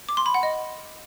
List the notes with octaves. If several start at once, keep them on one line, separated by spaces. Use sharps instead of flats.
D6
C6
B5
F#5
D#5